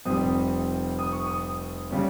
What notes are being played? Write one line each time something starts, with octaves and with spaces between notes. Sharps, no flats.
F1 F2 C3 G3 C4 D#6
D#6
C#6
D#6
C#3 G3 C#4